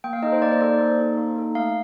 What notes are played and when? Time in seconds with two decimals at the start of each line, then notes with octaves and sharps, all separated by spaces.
0.04 A#3 G5
0.13 F5
0.23 D#4 A4 D#5
0.32 C5
0.42 A#3 D5
0.51 C5
0.61 D#4 A4 D5
0.80 A#3
0.99 D#4 A4
1.18 A#3
1.36 D#4 A4
1.55 A3 F5